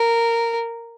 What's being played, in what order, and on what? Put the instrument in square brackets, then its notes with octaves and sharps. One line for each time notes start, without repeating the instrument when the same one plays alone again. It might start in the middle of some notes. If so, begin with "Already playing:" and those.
Already playing: [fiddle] A#4